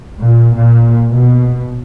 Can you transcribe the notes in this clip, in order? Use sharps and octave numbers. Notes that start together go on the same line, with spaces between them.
A#2
A#2
B2